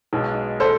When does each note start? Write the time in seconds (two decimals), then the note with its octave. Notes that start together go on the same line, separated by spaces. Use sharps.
0.13 B1 B2 G#3
0.60 A4 C5